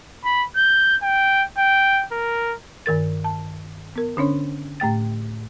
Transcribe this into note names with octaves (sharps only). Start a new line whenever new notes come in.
B5
G6
G5
G5
A#4
G2 D#3 A#4 A6
A5
B3 A#4
D3 C#4 D4 C#5
A2 A3 G5 A6